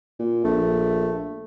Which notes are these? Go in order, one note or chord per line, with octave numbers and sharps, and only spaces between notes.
A#2
A#1 A3